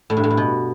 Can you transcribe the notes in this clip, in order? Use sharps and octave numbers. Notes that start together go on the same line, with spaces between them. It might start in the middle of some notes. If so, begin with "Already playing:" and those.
A2
G2
A2
G2
B2